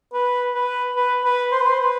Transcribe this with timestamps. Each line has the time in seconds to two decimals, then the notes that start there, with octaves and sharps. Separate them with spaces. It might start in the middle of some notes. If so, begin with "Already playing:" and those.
0.13 B4
0.55 B4
0.96 B4
1.24 B4
1.52 C5
1.61 B4
1.69 C5
1.80 B4